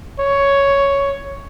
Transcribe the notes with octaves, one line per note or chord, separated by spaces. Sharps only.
C#5